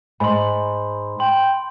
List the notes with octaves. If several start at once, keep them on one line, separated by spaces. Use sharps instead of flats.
G#2 B5 C6
G5 C6